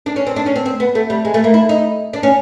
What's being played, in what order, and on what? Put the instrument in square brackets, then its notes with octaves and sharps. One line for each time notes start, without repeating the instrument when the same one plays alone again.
[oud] D4
C#4
C4
D4
C#4
C4
C4
B3
A3
G3
G#3
A3
A#3
E4
D#4
D4
C#4